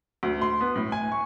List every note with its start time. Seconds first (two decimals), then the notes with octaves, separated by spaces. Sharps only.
0.23 D2
0.42 C6
0.61 B3
0.76 A2
0.92 G#5
1.12 C#6